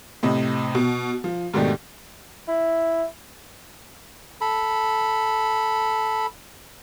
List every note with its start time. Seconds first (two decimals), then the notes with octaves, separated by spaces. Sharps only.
0.23 A2 C3 D#5
0.75 B2
1.24 F3
1.54 G#2 B2 D#3 A3 D4 G4
2.48 E4
4.41 A4 B5